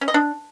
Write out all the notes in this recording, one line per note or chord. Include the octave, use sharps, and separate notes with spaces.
C#4
D#5
D4